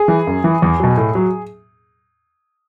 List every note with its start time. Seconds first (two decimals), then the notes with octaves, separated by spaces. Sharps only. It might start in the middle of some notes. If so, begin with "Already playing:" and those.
Already playing: G#4
0.08 E3
0.27 F#2
0.44 E3
0.62 E2
0.80 B2 F#3
0.97 A2
1.15 F#3